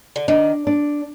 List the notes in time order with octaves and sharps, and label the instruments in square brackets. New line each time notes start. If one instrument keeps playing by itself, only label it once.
[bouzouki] D3
[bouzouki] D#3 [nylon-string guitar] D4
[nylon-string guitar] D4